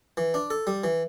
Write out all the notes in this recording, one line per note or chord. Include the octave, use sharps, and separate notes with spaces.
E3
D4
A4
G3
E3